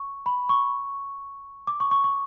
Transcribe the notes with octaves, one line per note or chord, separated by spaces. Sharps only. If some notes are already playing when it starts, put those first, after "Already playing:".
Already playing: C#6
B5
C#6
D6
C#6
C#6
C#6